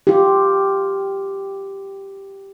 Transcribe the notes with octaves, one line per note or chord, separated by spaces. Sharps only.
F4 G4